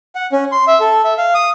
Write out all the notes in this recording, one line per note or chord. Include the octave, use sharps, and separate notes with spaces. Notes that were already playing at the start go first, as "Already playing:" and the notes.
F#5
C#4
C6
E5
A4
E5
F5
D#6